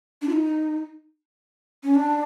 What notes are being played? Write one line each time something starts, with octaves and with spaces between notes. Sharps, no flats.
D4
F4
D#4
C#4
D4